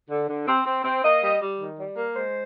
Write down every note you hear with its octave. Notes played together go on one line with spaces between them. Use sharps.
D3
D3
C4
C4
C4
A#3 D#5
G3
G3
D#3
G3
A#3
G#3 C5